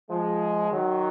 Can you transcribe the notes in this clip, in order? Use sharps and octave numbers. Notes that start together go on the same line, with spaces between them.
F3 G#3
D#3 F#3